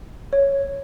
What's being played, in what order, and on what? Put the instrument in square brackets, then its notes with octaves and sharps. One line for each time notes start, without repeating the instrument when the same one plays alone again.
[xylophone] C#5